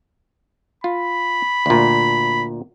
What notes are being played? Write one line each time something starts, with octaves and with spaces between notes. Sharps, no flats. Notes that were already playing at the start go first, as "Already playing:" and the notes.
F4 B5
D2 A#2